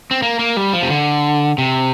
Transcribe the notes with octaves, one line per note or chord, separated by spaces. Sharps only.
C4
A#3
A#3
G3
F3
C3
D3
C3